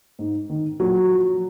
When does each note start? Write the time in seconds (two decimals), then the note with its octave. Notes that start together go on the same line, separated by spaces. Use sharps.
0.19 G#2
0.49 D#3
0.80 A#2 F#3
1.11 F3